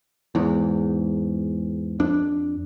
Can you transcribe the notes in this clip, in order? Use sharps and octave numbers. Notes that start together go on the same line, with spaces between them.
E2 G#2
F2 D4